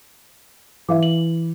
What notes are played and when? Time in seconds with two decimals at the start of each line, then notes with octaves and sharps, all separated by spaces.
0.89 E3 E5 F5 D6
1.03 F#7